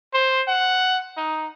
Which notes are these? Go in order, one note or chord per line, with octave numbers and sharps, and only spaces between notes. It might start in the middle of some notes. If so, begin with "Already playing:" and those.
C5
F#5
D#4